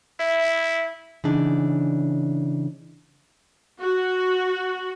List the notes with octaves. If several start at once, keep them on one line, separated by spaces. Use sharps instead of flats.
E4 E5
C#3 E3 D4 D#4
F#4